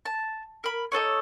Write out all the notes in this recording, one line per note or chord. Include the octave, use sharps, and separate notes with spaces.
A5
A#4 B5
D#4 A4 B4 C#5